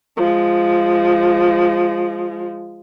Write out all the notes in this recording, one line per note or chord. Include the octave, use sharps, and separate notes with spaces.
F3 G#3